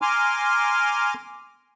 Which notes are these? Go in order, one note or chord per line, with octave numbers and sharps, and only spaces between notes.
G#5 A#5 C6 D6 F6